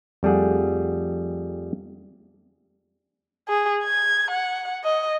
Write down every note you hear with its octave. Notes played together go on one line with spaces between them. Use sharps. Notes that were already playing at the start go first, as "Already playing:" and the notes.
F2 G3 A3 G#4 F#5
G#4
G#6
F#5
D#5